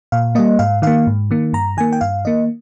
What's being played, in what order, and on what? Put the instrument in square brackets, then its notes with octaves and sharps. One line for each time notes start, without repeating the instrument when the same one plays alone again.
[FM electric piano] A#2 F5
G3 A#3 D#5
G#2 F5
D#3 A#3 F5
G#2
D#3 A#3
G2 A#5
D#3 A#3 G#5
G5
G2 F5
D#3 A#3 D#5